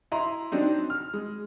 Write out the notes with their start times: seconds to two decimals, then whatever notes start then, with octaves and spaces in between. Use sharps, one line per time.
0.12 E4 D#5 A#5 C6
0.52 F#3 C4 D4 D#4
0.90 F6
1.13 G#3